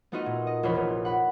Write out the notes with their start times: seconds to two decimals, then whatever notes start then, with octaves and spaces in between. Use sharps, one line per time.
0.12 A3 B3 D#4 F4 F#4 D#5
0.26 A#2
0.47 D#5
0.63 F1 E2 F4 C#5 B5
0.75 A#1
1.05 F#5 B5